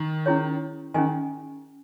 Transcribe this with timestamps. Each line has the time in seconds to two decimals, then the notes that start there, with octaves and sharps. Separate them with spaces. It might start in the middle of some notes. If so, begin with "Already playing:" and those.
Already playing: D#3
0.26 C#4 E4 G#4 C#5
0.94 D#3 C#4 G#4 D#5 G#5